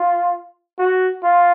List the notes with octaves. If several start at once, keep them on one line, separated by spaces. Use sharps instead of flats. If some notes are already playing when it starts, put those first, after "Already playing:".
Already playing: F4
F#4
F4